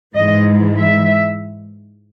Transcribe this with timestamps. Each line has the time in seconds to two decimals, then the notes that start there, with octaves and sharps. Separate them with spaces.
0.15 G#2 E3 G#3 D#5
0.76 E5